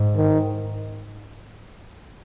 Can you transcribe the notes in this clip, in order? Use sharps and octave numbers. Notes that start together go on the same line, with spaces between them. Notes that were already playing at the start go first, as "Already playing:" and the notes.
Already playing: G#2
D#3